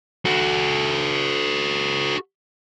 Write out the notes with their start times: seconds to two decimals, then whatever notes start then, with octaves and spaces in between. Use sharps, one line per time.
0.25 F#4 A4